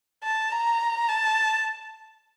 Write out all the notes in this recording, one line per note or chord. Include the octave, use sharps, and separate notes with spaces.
A5
A#5
A5